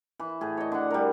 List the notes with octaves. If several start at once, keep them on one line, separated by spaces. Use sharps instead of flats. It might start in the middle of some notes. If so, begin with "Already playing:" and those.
E3
A2 G#4
C#5 D#5
D3 F#5
G3 A#4